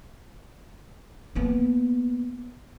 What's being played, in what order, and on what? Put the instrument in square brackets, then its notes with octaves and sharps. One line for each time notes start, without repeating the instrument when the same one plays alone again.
[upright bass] A#3 B3